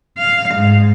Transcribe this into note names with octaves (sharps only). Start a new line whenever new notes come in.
F5
G#2